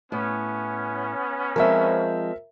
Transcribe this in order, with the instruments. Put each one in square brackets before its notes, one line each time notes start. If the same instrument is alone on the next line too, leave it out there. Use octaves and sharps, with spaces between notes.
[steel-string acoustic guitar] A2 [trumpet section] B3 C#4
[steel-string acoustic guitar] F3 G#3 C4 [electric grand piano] A#4 E5